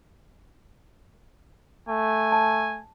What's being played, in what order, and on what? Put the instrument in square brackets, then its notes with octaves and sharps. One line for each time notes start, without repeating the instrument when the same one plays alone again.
[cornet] A3 [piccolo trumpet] G#5
[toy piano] A5